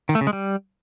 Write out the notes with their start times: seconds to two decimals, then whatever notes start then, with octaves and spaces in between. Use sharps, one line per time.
0.09 D#3
0.15 A3
0.21 C#3
0.27 G#3
0.33 G3